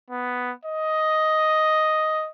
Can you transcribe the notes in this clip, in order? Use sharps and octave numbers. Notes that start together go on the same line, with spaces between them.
B3
D#5